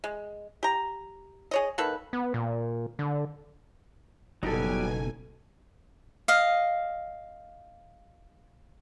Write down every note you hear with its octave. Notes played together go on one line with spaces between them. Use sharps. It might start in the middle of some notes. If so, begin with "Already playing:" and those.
G#3
G4 A#5
G#4 C#5 D#5
D#3 A#3 A4 B4
B3
A#2
D3
F#1 B2 F#3 G3 D#4 G4 A4 G#5
D#5 F5